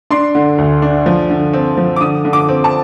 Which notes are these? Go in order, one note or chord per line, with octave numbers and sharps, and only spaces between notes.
D4 C6
D3
D2
D4
F3
D3
C4
F3
D6
D3 D#6
D3
D6
C4
A5